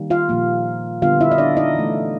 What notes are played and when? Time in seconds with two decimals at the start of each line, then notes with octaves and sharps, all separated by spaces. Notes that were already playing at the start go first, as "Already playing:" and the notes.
Already playing: D#3 G3 A#3
0.10 F4 F5
0.29 A#2 F3 A#3
1.02 D3 G3 B3 F4 F5
1.21 E4 E5
1.31 D#5
1.38 D4 D5
1.57 D#4 D#5
1.75 E3 A3